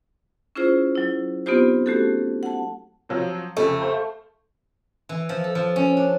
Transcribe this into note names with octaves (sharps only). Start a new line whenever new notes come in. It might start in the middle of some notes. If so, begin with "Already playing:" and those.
C#4 E4 F4 G#4 C5
F#3 E4
B3 C4 D#4 F4 G4 C5
A3 C#4 F#4 G4 A4
F#5 A5
F3 F#3 C4
F2 C#3 A3
C5 F5 C#6
E3
F3
A4
F3
C#4
D4